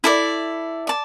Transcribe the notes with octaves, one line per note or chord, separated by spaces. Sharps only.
E4 A4 D5
D5 A5